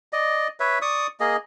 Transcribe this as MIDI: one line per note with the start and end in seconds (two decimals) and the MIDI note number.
0.13 0.48 74
0.13 0.48 75
0.60 0.79 71
0.60 0.79 73
0.60 0.79 76
0.82 1.07 74
0.82 1.07 85
0.82 1.07 87
1.20 1.37 58
1.20 1.37 68
1.20 1.37 75